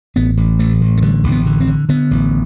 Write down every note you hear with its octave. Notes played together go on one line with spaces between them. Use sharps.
A1 B3
A1
A1 A3
A1
A3
D3 G3
A1
B3
D3
C4
D3
D3 B3
A1